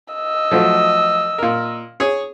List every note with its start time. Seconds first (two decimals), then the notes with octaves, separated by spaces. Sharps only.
0.14 D#5 E6
0.51 F3 F#3 A3
1.38 A#2 A#4
2.00 G#4 C#5